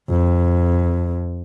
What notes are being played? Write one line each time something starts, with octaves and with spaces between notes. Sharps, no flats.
F2